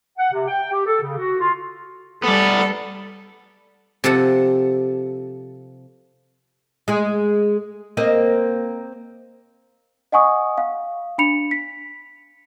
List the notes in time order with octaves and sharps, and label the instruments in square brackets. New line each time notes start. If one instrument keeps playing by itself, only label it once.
[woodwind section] F#5
C3
G5
G4
A4
C#3
F#4
F4
[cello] G3 A4 [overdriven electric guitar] B3 D5
[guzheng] C3 F3 A4 F#5
[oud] G#3 G#4
A#3 C4 D#5
[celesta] D#5 F#5 G#5 C#6 D#6
F5
D4 B5 C#7 F7
B6